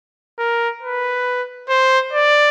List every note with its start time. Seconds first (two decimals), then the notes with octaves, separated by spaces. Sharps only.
0.39 A#4
0.82 B4
1.69 C5
2.13 D5